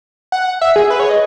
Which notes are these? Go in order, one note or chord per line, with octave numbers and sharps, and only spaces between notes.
F#5
E5
G#4
B4
C#5
D#5